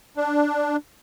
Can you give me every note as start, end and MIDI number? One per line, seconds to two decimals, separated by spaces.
0.17 0.76 62